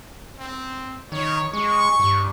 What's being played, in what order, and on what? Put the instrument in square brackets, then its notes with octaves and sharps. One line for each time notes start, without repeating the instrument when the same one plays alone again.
[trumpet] C4
[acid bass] D#3 [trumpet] C#5
[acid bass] G#3 [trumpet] C#6
[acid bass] G2